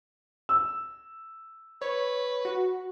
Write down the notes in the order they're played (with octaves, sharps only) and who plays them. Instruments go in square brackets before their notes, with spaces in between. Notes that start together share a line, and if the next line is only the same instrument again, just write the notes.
[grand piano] E6
[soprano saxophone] B4 [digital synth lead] C#5
[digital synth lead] F#4